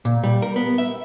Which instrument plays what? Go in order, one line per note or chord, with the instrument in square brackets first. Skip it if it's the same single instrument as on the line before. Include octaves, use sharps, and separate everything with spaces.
[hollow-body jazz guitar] A#2
G3
A#4
B3
E5